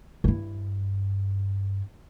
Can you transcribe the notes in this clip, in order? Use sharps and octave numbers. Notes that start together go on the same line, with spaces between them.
G2 E4